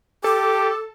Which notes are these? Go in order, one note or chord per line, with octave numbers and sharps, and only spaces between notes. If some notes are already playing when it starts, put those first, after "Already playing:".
G4 A4 D6